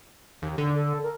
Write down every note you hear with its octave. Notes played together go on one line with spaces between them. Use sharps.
D#2
D3
A4
A#4